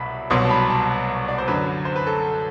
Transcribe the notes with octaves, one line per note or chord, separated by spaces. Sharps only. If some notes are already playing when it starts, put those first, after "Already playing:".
Already playing: C2 B2 F#3 E5 B5
C2 B2 F#3 C6
A5
B5
A5
D5
C5
F#2 D3 F#3 B4
C5
B4
A4